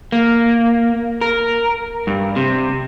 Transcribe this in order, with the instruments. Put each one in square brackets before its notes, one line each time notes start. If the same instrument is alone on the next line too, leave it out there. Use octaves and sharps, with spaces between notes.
[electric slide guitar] A#3
A#4
G2
C3